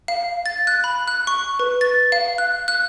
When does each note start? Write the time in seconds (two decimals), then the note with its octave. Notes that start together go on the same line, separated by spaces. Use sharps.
0.08 F5
0.46 A6
0.67 F#6
0.84 B5
1.08 F#6
1.27 C#6
1.59 B4
1.81 A6
2.12 F5
2.38 F#6
2.68 F#6